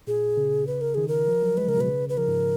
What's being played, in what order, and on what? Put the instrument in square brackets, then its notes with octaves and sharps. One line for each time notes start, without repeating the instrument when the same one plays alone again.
[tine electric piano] A#2 [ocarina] G#4
[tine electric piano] C#3
[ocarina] B4
A#4
[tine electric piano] D#3 [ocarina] G#4
[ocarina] A#4
[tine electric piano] F3
F#3
[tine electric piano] G#3 [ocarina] B4
[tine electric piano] C#3 [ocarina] A#4
[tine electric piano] B2 [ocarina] B4
[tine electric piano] C#3
[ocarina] B4
[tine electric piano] F3 [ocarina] A#4
[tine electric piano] G#2